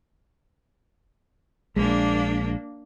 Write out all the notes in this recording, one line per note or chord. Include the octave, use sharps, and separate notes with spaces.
A#1 G#3 A#3 D4